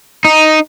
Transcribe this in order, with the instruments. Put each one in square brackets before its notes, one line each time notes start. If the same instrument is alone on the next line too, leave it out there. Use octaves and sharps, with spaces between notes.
[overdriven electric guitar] D#4